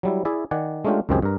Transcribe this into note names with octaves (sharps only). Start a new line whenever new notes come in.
F#3 G3 E4
E4 G#4 D5 E5
D#3 D5 F#5 G#5
G#3 A3 C#4 D4 F4 G4
C#2 F#2 D#3 C4 G4 G#4
G2 A#4